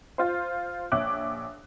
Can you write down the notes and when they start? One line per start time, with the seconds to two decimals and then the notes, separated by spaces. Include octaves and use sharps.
0.18 F4 C5
0.92 A#1 C#5 E5 D6 F#6